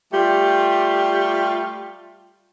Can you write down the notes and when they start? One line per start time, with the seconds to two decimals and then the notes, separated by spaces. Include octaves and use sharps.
0.13 G3 A3 F4 G4